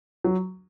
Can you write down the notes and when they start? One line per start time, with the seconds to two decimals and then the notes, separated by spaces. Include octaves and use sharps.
0.24 F#3